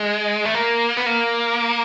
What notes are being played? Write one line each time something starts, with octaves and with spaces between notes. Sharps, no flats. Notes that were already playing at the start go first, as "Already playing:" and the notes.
Already playing: G#3
A3
A#3
B3
A#3